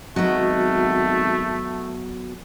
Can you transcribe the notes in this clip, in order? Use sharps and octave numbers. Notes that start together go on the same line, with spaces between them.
G#1 F#3 A3 B3 F#4 D#5